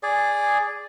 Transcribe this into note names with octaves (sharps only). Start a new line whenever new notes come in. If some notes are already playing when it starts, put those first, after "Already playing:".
G#4 D5